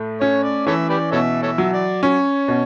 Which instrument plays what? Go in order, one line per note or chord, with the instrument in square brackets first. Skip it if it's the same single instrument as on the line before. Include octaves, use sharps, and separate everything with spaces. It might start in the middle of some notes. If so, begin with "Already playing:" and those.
Already playing: [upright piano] A2 A3
[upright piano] C#4 [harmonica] C#5
[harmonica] D5
[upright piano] E3 [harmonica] A4 C#5 E5
[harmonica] G4 B4 D5
[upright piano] B2 [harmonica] A4 C#5 E5
[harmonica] A4 C#5 E5
[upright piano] F#3
[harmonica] D5
[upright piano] C#4 [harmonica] C#5
[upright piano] B2